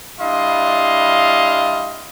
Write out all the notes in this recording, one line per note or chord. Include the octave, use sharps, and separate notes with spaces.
G3 D4 E4 D#5 F5 C6